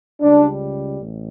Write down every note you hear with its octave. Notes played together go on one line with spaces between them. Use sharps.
C#2 C#3 G3 D4
A1